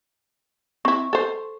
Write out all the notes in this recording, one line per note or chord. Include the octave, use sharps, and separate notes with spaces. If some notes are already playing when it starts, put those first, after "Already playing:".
C4 E4 C#6
A4 C5